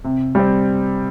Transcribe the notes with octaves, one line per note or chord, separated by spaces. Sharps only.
C3
G3 C4